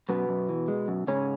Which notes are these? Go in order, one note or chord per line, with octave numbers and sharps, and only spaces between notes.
F#2 B2 B3
F#2
E3
G#3
F#2
G#2 C#3 C#4